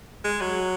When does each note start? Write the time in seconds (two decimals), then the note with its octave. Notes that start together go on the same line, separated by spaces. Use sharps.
0.25 G#3
0.41 F#3